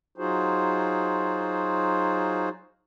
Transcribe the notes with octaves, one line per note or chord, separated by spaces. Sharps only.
F#3 D#4 F4 F#4 G#4 C5